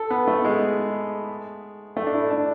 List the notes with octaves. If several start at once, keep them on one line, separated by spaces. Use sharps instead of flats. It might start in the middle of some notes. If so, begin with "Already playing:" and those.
Already playing: A4
B3
A3
G#3
A3
D4
E4
D4